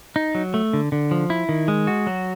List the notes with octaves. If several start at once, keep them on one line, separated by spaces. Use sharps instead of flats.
D#4
F#3
A3
D3
D3
F3
E4
D#3
G#3
F#4
F#3